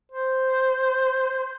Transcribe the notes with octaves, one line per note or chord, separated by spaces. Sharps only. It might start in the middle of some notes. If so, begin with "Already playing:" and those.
C5